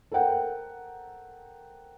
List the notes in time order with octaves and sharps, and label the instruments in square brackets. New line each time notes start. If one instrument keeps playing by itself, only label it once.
[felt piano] A4 A#4 C5 F#5 G5